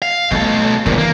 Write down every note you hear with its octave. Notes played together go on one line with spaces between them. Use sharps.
F5
B2 A3 A4
C2 A#2 D#3 E3
A#3